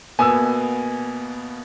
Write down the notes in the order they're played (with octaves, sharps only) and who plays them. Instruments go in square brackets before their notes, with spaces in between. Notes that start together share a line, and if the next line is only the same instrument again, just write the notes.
[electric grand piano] B2 A#3 B3 [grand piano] G#5 D#6 E6